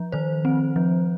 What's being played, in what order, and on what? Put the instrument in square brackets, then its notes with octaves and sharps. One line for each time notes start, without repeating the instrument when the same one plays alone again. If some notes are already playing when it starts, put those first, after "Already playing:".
Already playing: [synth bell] F3
D#3 C5
C4
F3